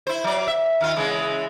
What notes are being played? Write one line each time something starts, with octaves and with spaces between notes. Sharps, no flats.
E4 C5
F#3 D5
E5
D#3 F4
C#3 E3 G#3